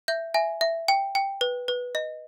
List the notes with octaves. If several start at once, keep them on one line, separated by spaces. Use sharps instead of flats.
E5 G6
E5 G#5
E5
G5
G5
B4
B4
D#5